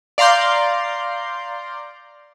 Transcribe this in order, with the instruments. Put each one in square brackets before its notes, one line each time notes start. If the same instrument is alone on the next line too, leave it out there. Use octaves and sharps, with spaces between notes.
[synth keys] D5 F5 A#5 C6 G6